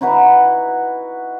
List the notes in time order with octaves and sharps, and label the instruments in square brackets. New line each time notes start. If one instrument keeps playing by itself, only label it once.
[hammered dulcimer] D#4 E4 F#4 B4